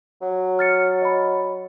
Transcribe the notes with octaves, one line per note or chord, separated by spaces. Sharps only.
F#3
F6 A6 C#7
D#5 B5